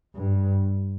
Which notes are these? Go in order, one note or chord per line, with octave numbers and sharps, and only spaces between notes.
G2